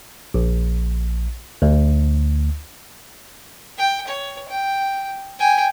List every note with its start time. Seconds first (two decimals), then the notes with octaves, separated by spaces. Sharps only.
0.34 A#1
1.62 D2
3.77 G5
4.07 C#5
4.48 G5
5.39 G5 G#5